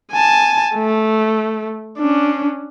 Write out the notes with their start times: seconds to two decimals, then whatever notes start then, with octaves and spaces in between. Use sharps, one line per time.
0.13 G#5 A5
0.75 A3
1.98 C#4 D4